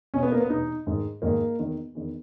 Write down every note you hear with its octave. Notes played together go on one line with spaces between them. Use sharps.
E2 B2 C#4
B3
A#3
B3
E2 B2 D#4
G#2 D#3
G#2 D#3 A#3
E2 D#3
E2 D#3